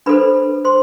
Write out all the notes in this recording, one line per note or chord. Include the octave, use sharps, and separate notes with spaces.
D4 A4 B4 C5 B5
C5 C6